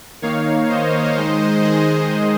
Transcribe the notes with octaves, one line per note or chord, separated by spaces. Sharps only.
D#3 A#3 D#4 C#5 F5
C5 D#5
D#3 G#3 D#4
G#4 C5